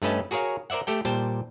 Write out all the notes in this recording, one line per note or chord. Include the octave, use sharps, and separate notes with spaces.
G2 A3 C#4 B4 D#5 A5
F#4 G#4 A#4 C#5 F5
A#4 C5 D5 E5 F#5
A3 G4 A4 G5
A#2 G3 C5 G5 A5